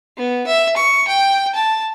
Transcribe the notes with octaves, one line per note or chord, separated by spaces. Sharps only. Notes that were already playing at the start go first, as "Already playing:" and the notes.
B3
E5
C#6
G5
A5